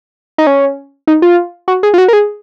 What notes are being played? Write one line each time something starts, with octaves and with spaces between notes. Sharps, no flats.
D#4
C#4
D#4
F4
F#4
G#4
F4
F#4
A#4
G#4